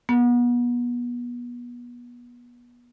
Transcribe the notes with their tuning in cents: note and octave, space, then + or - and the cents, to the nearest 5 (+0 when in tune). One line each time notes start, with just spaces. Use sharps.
B3 -30